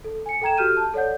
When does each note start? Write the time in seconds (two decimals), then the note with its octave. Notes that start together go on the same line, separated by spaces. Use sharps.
0.04 A4
0.26 G#5 C#7
0.42 A4 G5 A#5 G#6 E7
0.57 F#4 G4 A4 F6 G6 D#7
0.77 A5
0.94 A4 C#5 D5 F#5 G6